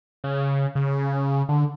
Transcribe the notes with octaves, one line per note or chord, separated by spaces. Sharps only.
C#3
C#3
D3